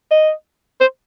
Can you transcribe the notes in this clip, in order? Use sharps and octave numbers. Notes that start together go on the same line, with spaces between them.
D#5
C5